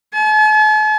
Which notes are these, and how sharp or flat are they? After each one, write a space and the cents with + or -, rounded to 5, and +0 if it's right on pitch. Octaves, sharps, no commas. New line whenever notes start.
A5 -45